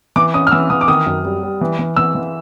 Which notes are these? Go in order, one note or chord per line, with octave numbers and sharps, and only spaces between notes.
E3 D6
C#4 D#6
F6
E3 E6
E3 D#6
D6
D#3 D#6
F#2
G3
G3
E3
E3
E3 E6
E3